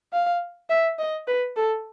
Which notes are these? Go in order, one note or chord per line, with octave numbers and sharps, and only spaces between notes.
F5
E5
D#5
B4
A4